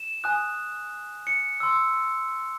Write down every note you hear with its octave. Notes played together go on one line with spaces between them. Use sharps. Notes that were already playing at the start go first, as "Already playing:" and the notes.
Already playing: E7
G#5 D#6 F#6
C#7
C6 E6